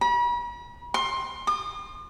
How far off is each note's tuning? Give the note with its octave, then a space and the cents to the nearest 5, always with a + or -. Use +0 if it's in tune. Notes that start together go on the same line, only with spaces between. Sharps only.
B5 -40
C6 +20
D#6 -45